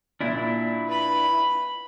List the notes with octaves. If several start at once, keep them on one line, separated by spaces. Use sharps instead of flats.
A#2 D4 E4
B4 B5